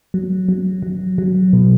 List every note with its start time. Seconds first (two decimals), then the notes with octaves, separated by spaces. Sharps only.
0.14 F#3
0.48 F#3
0.83 F#3
1.18 F#3
1.53 B2